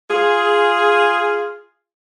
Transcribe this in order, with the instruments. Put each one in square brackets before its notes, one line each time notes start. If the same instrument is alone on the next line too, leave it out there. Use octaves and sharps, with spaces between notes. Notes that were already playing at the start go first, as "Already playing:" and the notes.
[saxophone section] F4 G#4